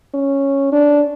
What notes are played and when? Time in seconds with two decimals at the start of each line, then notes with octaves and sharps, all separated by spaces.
0.14 C#4
0.72 D4